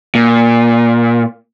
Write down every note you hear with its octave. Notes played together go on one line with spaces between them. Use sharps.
A#2